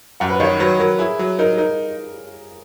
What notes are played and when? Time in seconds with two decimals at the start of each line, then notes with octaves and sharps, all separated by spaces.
0.20 F#2 F#5
0.30 B4
0.40 D#3 C#5
0.60 F#3 B4
0.79 F#3 A#4
0.98 E4 G#4
1.19 F#3
1.39 D#4 A#4
1.57 D#4 A#4